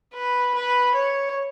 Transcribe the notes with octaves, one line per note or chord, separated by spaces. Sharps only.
B4
B4
C#5